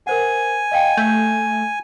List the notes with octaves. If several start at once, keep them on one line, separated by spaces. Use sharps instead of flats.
A#4 C5 F#5 G#5
D#5 F5 G5
A3 G6